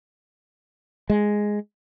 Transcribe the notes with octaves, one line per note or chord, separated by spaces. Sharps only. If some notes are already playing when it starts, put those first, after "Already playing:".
G#3